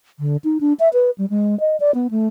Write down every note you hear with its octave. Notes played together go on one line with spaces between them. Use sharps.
D3
D#4
D4
E5
B4
G3
G#3
D#5
D5
B3
A3